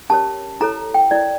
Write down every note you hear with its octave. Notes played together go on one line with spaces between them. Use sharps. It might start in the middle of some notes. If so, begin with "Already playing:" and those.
C#4 G4 A#4 C#5 A5
E4 A4 C#5 A#5
G5
E4 A#4 C#5 D5